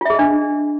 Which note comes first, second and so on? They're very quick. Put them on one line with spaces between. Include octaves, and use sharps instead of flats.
F4 E5 G#4 D#5 D4